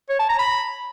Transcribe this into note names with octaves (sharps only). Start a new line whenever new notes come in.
C#5
A5
A#5
B5